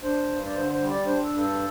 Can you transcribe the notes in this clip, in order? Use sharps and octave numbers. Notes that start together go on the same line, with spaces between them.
D4 C5
G2
D5
D3 C5
C5
G3
D5
D4 C5
A4
G2
A4